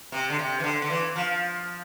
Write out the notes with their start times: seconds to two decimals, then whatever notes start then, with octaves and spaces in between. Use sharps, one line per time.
0.12 C3
0.30 D3
0.39 C3
0.60 E3
0.64 D3
0.82 D3
0.90 E3
1.16 F3